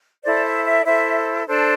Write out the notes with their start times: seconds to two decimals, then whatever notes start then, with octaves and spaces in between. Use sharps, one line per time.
0.24 E4 A4 C5 D5
0.45 E5
0.65 E5
0.82 D5
0.86 E4 A4 C5 E5
1.47 D4 A4 C5